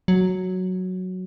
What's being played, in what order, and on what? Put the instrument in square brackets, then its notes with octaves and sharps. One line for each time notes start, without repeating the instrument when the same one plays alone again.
[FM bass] F#3